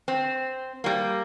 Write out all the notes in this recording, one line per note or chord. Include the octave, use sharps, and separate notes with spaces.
C4
G3 A#3